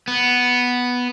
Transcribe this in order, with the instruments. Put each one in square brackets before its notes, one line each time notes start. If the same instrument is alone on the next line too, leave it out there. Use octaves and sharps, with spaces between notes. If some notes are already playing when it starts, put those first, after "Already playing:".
[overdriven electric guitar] B3